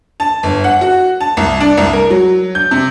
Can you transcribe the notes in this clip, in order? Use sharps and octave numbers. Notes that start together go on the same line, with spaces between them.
A5
G1
F#5
F#4
A5
C2
D4
C2
A#4
F#3
G6
C3